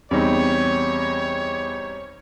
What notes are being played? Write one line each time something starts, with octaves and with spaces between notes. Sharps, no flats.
E2 G3 C4 D#4 C#5